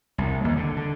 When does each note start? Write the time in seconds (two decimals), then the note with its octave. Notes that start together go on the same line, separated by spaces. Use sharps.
0.18 C2
0.44 D#2
0.57 D3
0.77 D3